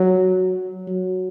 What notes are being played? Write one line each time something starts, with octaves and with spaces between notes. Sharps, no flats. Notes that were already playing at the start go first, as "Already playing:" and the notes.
Already playing: F#3
F#3